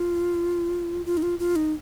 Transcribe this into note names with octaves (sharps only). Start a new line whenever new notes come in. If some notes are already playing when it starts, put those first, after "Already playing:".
Already playing: F4
F4
D#4
F4
F4
D#4